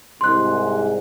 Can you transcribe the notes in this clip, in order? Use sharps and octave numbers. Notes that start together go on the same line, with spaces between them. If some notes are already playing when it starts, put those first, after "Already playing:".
C2 G#2 C6 F#6